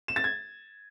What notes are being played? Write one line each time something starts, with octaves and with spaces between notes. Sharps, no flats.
E7
A6
G#6